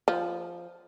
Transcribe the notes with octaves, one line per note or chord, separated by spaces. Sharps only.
F3